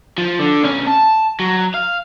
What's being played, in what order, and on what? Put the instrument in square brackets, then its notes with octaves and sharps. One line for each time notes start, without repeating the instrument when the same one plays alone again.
[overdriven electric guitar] F3
D3
B1 C#4
A5
F#3
F5